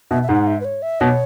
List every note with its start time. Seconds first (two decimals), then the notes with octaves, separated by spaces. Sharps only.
0.11 B2 E5
0.23 E5
0.28 G#2 F#5
0.47 E5
0.61 B4
0.65 C#5
0.82 E5
1.00 B2 C#5